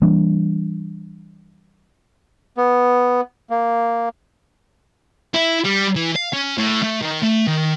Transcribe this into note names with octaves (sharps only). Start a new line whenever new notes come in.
E3 G3 A#3 D4
B3
A#3
E4
G3
E3
F5
C#4
A2
A3
D#3
A3
D#3